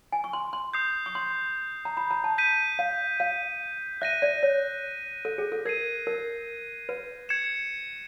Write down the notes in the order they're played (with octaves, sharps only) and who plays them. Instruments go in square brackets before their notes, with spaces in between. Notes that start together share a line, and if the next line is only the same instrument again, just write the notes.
[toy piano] G#5
C#6
C6
C6
[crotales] D#6 G6 C7
[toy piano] C#6
C6
A#5
B5
A#5
A5
[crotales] G6 B6 D#7
[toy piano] F5
F5
[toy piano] E5 [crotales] F#6 A#6 D#7
[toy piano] D5
C#5
A4
G#4
A4
[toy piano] A#4 [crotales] G#6 C7 D#7
[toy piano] A#4
B4
[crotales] G#6 C#7 E7